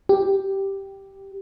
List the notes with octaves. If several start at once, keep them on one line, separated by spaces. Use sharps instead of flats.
G4